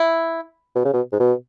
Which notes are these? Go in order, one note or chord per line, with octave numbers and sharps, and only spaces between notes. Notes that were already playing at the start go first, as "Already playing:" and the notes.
Already playing: E4
B2
C#3
B2
G#2
B2